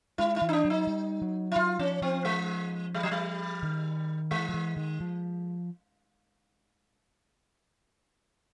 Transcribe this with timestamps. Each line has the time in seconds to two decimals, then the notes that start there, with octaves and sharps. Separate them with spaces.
0.18 G#3 E4
0.36 E4
0.42 E3
0.49 D#4
0.53 D4
0.65 F#3
0.70 D#4
0.87 G3
1.22 F#3
1.52 E4
1.56 F#3 F4
1.79 F3 C#4
2.02 F3 C4
2.25 G#3
2.94 G3
3.03 F#3
3.11 G3
3.63 D#3
4.31 E3 G#3
4.49 F3
4.54 E3
4.77 D#3
5.01 F3